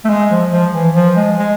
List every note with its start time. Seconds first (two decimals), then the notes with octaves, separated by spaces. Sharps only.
0.05 A3
0.09 G#3
0.31 F3
0.53 F3
0.73 E3
0.95 F3
1.16 G#3
1.38 G#3